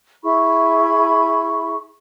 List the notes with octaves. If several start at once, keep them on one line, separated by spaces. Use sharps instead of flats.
E4 G#4 B5 C#6